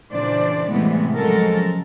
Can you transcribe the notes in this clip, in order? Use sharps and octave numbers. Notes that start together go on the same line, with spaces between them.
A#2 C#3 E3 D4 C5 D5
A2 C3 E3 G3 G#3 B3
C#3 F3 F#3 G#3 A4 A#4